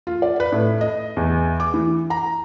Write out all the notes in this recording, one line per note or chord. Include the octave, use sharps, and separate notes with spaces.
F4
D5
B4
A2
D#5
E2
D6
E3
A#5